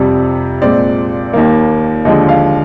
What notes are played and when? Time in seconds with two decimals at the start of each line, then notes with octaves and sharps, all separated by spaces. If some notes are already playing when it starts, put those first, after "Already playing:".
Already playing: F2 C3 G3
0.62 A#2 G#3 C4 D5
1.33 D#2 D#3 A#3
2.05 D#2 D3 F3 G#3 D#5
2.29 F5